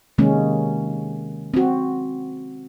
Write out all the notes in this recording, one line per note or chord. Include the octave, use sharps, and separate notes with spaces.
C3 D#3 G#3 A#3 C#4
C4 F#4